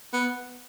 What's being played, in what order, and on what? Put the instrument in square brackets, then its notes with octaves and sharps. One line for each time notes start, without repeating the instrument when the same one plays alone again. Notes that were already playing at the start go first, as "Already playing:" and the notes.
[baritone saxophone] B3